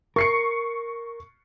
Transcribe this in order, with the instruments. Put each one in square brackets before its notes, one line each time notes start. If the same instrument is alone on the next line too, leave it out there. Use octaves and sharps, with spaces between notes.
[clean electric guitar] A#4 [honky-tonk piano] C#6 C7 C#7